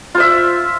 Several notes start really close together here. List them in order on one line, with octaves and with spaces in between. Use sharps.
F4 C5 E5